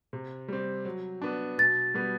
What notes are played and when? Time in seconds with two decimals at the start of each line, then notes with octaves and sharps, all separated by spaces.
0.13 C3
0.48 G3 C4
0.85 F#3
1.22 B3 D4
1.58 B2 A6
1.94 G3 B3